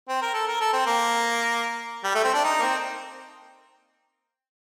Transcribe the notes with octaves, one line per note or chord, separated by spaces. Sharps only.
C4
A#4
A4
A#4
A4
C4
A#3
G3
A3
C4
D4
D#4
A#3
C4